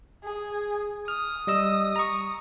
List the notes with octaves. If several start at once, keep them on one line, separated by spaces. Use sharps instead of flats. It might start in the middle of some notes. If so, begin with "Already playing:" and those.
G#4
D#6 F6
G3 D#5 E6
A#5 C#6